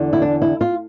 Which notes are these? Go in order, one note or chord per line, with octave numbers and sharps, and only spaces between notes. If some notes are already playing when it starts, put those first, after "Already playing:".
Already playing: E2 D3
E4
D4
E4
F4